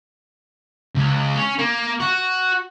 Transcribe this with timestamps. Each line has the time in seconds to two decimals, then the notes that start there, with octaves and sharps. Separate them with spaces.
0.95 C#2
1.36 C#4
1.59 A#3
2.00 F#4